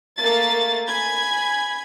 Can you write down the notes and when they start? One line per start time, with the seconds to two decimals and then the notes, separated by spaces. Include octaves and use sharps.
0.18 A3 A#3 A6
0.88 G#5 B5 G#6